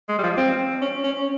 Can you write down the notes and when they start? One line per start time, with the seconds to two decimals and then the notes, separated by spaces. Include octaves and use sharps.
0.09 G#3
0.19 G3
0.23 F3
0.37 C4
0.82 C#4
1.04 C#4